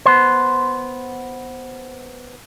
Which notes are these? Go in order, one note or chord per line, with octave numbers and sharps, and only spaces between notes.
B3 C5